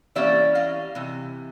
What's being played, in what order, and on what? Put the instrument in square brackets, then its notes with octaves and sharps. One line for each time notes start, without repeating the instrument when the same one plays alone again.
[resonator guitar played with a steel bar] E3 G3 A#3 C#4 D5 E5
D#5 F5
C3 E3